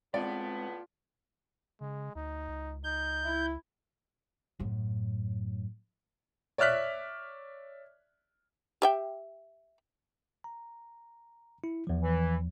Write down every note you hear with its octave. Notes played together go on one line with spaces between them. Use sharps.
A2 C#3 G#3 B3 C4 F4 D5
C#3 G#3
D2 D#4
C#2
D#4 G6
E4
F#2 A2
C#5 D5 E5 F6 F#6 B6
G4 E5 G5
A#5
E4
E2 F3
E3